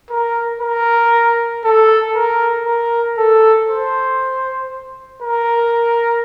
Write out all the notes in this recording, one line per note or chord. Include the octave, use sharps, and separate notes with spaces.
A#4
A#4
A4
A#4
A#4
A4
C5
A#4